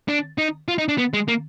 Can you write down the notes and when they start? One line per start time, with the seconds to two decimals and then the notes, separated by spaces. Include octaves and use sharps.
0.09 D4
0.38 D#4
0.68 F4
0.78 D#4
0.89 D4
0.98 B3
1.14 G#3
1.28 A#3